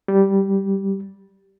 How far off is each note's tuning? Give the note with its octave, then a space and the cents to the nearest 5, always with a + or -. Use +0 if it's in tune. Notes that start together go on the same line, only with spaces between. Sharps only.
G3 -5